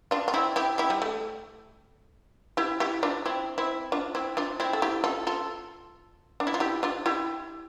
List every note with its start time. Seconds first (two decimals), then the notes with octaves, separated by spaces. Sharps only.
0.11 D4 F4
0.28 F4
0.34 C4 E4
0.56 E4 G4
0.78 E4 G4
0.90 G3
1.02 A3
2.57 E4 G4
2.80 E4 G4
3.03 D4 F4
3.25 C4 E4
3.58 C4 E4
3.92 D4 F4
4.15 C4 E4
4.37 D4 F4
4.60 C4 E4
4.73 A4
4.82 E4 G4
5.04 F4 A4
5.27 F4 A4
6.40 D4
6.47 E4
6.54 F4
6.60 E4 G4
6.83 D4 F4
7.06 E4 G4